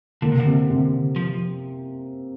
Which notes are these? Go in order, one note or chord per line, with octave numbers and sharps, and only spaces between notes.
D3 A#3
C3
D3
C3
C3
F3